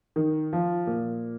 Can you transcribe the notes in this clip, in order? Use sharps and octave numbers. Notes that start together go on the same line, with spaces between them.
D#3
F3
A#2